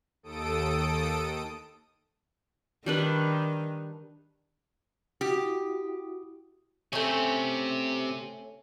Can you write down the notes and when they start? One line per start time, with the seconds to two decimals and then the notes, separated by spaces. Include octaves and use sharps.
0.23 D#2 A4 D#6 D7
2.86 D#3 G3 D4 B4
5.21 E4 F#4 G4 D#6
6.93 C3 A3 C4 C#4